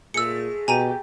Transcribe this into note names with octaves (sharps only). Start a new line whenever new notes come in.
A#2 G#3 A3 G#4 E6 C#7
B2 G4 G#5 A#5 D#7